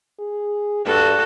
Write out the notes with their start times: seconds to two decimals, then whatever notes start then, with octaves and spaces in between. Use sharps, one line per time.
0.19 G#4
0.85 G2 F#4 A4